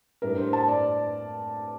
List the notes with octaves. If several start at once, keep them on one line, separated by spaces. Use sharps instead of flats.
A2 G3 D4 A#4
C5
A5
D5